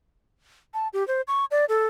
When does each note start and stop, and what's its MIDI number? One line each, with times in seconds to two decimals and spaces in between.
0.74 0.88 81
0.93 1.06 67
1.08 1.21 72
1.28 1.45 85
1.51 1.65 74
1.69 1.87 69